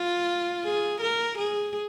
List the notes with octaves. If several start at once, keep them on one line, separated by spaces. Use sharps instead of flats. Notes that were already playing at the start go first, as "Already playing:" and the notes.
Already playing: F4
G#4
A#4
G#4